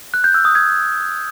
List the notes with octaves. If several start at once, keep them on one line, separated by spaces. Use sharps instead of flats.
F#6
G6
E6
D#6
G#6